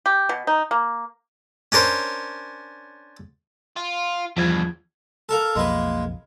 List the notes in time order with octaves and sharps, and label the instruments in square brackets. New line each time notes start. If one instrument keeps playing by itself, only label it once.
[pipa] G4
B2
D#4
A#3
[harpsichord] C#4 D4 A#4 C5
[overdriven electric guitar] F4
[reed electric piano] E2 F3 G#6 [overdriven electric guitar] G2 B2
[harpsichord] A4 A#4 F5
[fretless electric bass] B1 F2 [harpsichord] G#3 A#3 B4